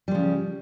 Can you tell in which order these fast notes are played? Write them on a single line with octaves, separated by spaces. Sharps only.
G3 F3 C#3